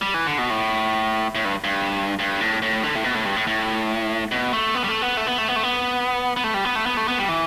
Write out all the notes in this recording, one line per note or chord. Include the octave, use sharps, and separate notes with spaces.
G3
E3
D3
B2
A2
A2
G2
G2
G2
A2
A2
D3
A2
B2
A2
G2
A2
A2
B2
A3
B3
G3
A3
B3
A3
B3
A3
B3
A3
B3
B3
A3
G3
B3
A3
B3
A3
B3
G3
E3